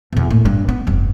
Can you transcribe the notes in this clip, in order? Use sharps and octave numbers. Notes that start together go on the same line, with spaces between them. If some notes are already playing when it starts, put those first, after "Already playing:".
E2 B2
A2 A#3
G2
B3
F1 G2